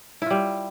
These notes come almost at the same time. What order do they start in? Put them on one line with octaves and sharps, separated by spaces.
E4 F4 G3